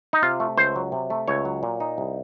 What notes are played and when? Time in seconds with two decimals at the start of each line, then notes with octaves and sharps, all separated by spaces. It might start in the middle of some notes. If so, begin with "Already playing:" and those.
0.13 D#4
0.23 C3 F4
0.40 A3
0.57 C#2 C5
0.76 F#3
0.92 C3
1.10 A3
1.28 C#2 C#5
1.45 F#3
1.63 A#2
1.80 D#4
1.98 C2